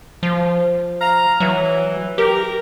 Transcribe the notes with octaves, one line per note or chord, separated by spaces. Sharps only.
F3
F5 A#5
E3 F#3
G4 A#4